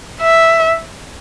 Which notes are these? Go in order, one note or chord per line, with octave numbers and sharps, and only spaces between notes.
E5